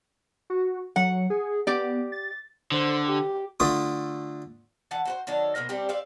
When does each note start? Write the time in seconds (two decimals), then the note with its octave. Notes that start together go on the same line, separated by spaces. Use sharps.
0.50 F#4
0.96 F#3 F#5
1.30 G#4
1.67 B3 G4 D5
2.12 A6
2.72 D3 C5
3.06 G4
3.60 D3 A3 F4 D#6
4.91 E3 F#5 A5
5.05 F#4 B4 C5
5.27 D#3 F#3 D4 A4
5.55 B2 A#3 A#4 C5
5.69 G3 C4 D4 G4
5.89 C5 D5 E5 F5